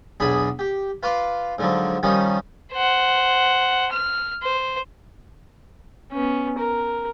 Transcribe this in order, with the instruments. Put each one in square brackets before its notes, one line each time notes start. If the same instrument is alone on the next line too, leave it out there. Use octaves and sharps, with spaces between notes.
[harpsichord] B1 E2 D4 G#4 B5
G4
F4 B4 F5 C6 D6
G#2 D3 F3 F#3
D#3 F3 G3 C#4 D#4
[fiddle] C5 F#5
F6
C5
[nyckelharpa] B3 C#4
A#4